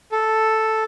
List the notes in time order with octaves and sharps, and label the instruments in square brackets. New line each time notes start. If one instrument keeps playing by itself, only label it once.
[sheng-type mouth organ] A4